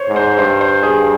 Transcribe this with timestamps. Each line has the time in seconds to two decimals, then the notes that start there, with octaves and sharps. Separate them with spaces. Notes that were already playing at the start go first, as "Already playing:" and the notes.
Already playing: C5 C#5
0.09 G#2
0.16 C5
0.38 G2 C5
0.61 C5
0.83 G#4